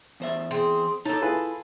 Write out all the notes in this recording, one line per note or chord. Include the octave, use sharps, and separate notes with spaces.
E2 C5 E5
C4 G#4
D#4 A4 C#5 A5
E4 F4 G#4 A4 B4